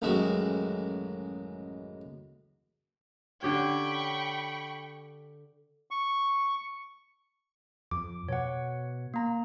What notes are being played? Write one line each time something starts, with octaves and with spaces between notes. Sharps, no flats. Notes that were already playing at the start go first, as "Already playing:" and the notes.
A1 F#2 D#3 G#3 F#4 E5
D3 G4 C#5 G5 B5 C#6
C#6
F2 D6
B2 C#5 F#5
A#3 A#5